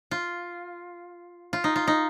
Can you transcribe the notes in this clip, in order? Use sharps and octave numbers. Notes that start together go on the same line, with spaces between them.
F4
F4
D#4
F4
D#4